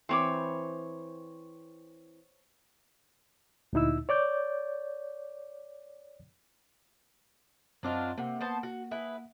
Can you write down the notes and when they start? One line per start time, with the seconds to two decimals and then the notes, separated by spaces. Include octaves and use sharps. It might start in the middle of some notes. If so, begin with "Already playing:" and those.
0.09 E3 C4 C5 C#5 B5 D6
3.73 D2 A#2 D#4 E4 E6
4.09 C#5 D5 D6 G6
7.83 F#2 F#3 C4 D4 F4 D#5
8.18 C3 A#3 F#5
8.41 B3 C5 A5
8.63 F#4
8.91 E4 G#4 B4